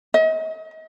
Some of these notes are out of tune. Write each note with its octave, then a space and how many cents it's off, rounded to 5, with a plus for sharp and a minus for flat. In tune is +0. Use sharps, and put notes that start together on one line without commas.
D#5 +40